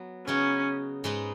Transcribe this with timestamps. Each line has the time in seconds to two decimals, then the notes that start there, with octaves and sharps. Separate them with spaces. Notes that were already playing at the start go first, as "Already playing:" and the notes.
Already playing: F#3 B3 F#4
0.27 C#3 B3 C#4 D#4 F#4
1.04 G#2 G#3 D#4 B4